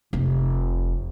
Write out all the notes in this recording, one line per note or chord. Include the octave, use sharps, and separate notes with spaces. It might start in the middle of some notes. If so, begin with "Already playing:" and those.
F1